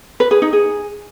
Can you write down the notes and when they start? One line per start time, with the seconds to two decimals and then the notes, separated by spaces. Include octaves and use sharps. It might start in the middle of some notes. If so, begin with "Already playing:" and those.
0.20 B4
0.31 G#4
0.42 D#4
0.53 G#4